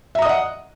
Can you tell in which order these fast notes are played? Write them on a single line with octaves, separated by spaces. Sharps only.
E5 A#5 D#6 D#5 F#5